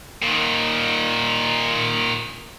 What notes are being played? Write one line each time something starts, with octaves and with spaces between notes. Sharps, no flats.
A#2 D#3